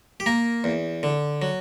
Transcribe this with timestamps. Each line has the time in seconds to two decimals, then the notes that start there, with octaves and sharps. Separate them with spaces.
0.20 G4
0.26 A#3 A#4
0.64 E2
1.03 D3
1.42 F#3